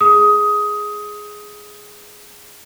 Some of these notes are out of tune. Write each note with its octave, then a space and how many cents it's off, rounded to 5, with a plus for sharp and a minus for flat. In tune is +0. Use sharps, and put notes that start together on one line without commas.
G#4 +0 D#6 +15